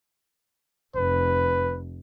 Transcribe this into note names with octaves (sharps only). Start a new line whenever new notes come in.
F1 B4